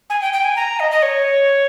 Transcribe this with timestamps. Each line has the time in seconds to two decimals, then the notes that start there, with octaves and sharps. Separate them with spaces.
0.09 G#5
0.21 G5
0.33 G5
0.44 G#5
0.56 A#5
0.79 D#5
0.91 D#5
1.02 C#5